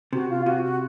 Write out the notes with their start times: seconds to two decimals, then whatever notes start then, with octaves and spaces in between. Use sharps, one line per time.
0.13 C3 F#4
0.29 F4
0.46 C3 F#4
0.63 F#4